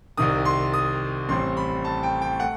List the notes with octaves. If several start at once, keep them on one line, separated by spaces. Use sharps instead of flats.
C2 C3 D#3 D#6
C6
D#6
A1 A2 G3 C4 C6
B5
A5
G5
G5
A3 F#5